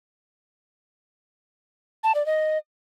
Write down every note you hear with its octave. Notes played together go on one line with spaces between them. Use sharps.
A5
D5
D#5